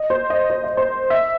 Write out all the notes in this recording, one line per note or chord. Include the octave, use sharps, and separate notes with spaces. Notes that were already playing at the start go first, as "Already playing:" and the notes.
Already playing: D#5
C5
D#5
C5
D#5
C5
E5